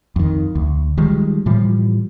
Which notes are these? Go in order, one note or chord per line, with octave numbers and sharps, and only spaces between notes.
F2 D#3
D2
D#3 F3 G3 G#3
A2 E3 F3 G3